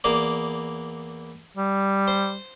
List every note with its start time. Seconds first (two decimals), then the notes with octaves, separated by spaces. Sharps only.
0.04 E2 A#3 D5
1.57 G3
2.08 C5